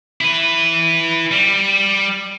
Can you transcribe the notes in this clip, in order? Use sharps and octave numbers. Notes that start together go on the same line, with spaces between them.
E4 B4
G3